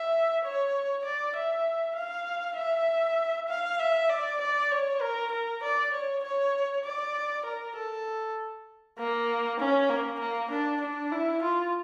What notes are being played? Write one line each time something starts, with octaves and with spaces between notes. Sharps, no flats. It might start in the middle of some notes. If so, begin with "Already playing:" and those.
Already playing: E5
C#5
D5
E5
F5
E5
F5
E5
D5
D5
C#5
A#4
A#4
D5
C#5
C#5
D5
A#4
A4
A#3
C#4
A#3
A#3
D4
D4
E4
F4